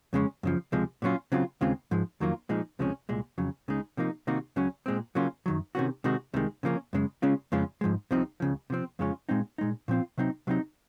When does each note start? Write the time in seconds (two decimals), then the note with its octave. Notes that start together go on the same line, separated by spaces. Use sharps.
0.13 F2 C#3 G#3 C#4
0.43 F#2 C#3 F3
0.72 C#2 C3 F3 G#3
1.02 A#2 F#3 C#4 F4
1.32 C#3 F#3 C4 F4
1.61 D#2 C#3 G#3 C4 F4
1.91 G#2 F3 G#3
2.20 F2 D#3 F#3 A#3 F4
2.49 A#2 F3 G#3 D#4
2.79 C#2 C3 F3 G#3 C#4
3.09 C2 A#2 G#3
3.38 F2 C#3 F#3
3.68 C#2 C#3 G#3 D#4
3.97 C3 F3 A#3 D#4
4.27 C3 D#3 A#3 D#4 F#4
4.56 C#2 C#3 F#3 C#4
4.86 A#2 G#3 C4
5.15 C#3 F#3 A#3 C#4 F4
5.46 F#2 D#3 F#3
5.75 C3 D#3 F#3 C#4 F#4
6.04 C3 D#3 G#3 D#4 F#4
6.34 C2 C3 D#3 G#3
6.63 C#3 F3 A#3 C#4
6.93 F#2 C#3 G#3
7.22 C#3 G#3 C#4 F4
7.52 F2 C#3 G#3 C#4 F4
7.81 G#2 F3 G#3
8.11 C2 C3 F3 C4 D#4
8.40 C#2 C#3 F3
8.70 C3 F3 C4
8.99 F2 C#3 G#3 C#4 F4
9.29 A#2 G#3 C4 D#4
9.58 A#2 G#3 D#4
9.88 A#2 F3 C4 F4
10.18 C3 F#3 C4 D#4
10.47 C3 F#3 C4 D#4